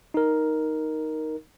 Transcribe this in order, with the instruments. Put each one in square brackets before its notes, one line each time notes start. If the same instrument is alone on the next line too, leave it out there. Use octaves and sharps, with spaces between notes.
[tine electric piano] D#4 A#4